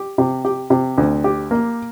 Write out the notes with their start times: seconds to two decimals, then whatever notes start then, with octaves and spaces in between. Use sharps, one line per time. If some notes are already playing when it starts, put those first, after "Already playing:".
Already playing: G4
0.18 C3
0.45 G4
0.70 C3
0.98 D2
1.24 G4
1.51 A#3